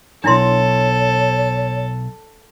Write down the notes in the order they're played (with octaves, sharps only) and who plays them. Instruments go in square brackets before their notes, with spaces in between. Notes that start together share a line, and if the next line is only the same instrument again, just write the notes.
[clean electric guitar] B1 F2 [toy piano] D4 E4 C6 [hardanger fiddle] A4 [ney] C#5